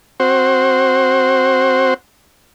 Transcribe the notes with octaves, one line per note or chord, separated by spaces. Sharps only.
C4 F#4 C5